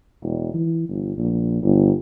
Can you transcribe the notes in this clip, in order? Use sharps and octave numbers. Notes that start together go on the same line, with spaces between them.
E1
E3
G1
A#1
G1